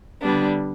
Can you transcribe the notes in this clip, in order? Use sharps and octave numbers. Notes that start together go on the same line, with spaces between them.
D3 G3 B3 D4